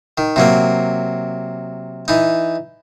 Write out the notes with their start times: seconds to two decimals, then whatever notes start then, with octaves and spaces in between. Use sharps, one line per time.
0.18 D#3
0.36 C3 F#3 A#3
2.08 E3 D#4